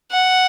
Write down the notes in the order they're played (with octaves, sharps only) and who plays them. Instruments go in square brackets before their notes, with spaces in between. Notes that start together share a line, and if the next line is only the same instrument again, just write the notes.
[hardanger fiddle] F#5